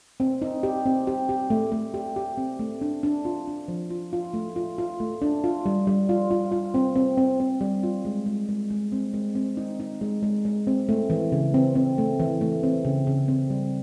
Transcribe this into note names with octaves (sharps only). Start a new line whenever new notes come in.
C4
D#4
G4
C4
G4
G4
A3
A3
G4
G4
C4
A3
D4
D4
F4
D4
F3
F4
F4
A3
F4
F4
A3
D4
F4
G3
G3
F4
F4
F4
C4
C4
C4
C4
G3
F4
G#3
G#3
G#3
G#3
C4
G#3
C4
D#4
D#4
G#3
G#3
G#3
C4
A3
E3
C#3
C4
C4
A3
E3
A3
C4
C#3
C#3
C4
G3